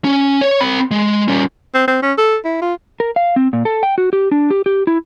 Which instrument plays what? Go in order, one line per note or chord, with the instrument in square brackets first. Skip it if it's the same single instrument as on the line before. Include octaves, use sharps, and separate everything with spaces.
[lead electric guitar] C#4
C#5
C4 B5
G#3
G3 C#4
[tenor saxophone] C4
C4
C#4
A4
E4
F4
[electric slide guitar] A#4
F5
C4
A#2
A4
G5
F#4
G4
D4
G4
G4
E4